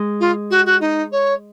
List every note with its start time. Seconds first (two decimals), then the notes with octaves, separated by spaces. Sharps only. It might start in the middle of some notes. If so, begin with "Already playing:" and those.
Already playing: G#3
0.20 F4
0.50 F#4
0.65 F#4
0.80 D#4
1.11 C#5